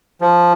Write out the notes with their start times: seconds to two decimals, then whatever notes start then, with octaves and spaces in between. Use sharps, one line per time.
0.21 F3